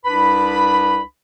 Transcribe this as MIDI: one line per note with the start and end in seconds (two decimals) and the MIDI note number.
0.05 1.01 36
0.05 1.01 62
0.05 1.01 71
0.05 1.01 83